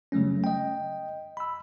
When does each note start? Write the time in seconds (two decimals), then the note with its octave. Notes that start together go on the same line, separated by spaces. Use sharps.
0.12 C#3 F#3 G3 A3 C#4
0.44 D#5 G5
1.37 B5 E6